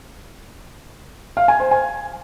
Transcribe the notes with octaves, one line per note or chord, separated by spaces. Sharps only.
F5
G#5
C5
G#5